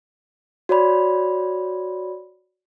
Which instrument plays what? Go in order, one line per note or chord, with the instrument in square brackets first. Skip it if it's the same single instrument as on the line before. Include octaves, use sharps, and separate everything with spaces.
[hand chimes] F#4 C#5 D5 B5